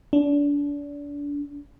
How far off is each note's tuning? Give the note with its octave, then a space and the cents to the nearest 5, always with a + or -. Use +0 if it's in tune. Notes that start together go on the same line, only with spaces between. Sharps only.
D4 -30